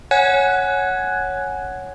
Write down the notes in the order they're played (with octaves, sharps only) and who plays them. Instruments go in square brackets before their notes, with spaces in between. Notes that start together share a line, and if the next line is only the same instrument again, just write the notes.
[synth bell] C#5 F#5 G#5 F#6 G#6